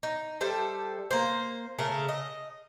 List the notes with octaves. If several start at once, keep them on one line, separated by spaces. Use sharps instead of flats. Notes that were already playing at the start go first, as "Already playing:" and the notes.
D#4
G3 A4 C5 E5
A#3 C5
C#3 A3 A#4
D#5